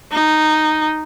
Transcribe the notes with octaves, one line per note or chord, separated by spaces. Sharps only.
D#4